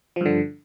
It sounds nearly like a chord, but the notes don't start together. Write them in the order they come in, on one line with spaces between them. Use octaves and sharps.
F3 G2 D3